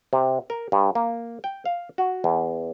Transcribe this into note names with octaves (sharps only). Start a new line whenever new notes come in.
C3
A#4
G2
A#3
G5
F5
F#4
E2